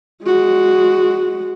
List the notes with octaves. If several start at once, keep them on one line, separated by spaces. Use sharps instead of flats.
G#3 F#4